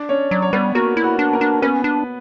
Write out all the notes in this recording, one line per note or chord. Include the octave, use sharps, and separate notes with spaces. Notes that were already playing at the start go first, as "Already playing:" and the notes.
Already playing: D4 D5
C#4 C#5
F#3 D5
C#5
G3 B3 B4
A#3 F#4 A#4
E4
F#4
D4
A#3 A#4
D4
B3 C#4 B4
D4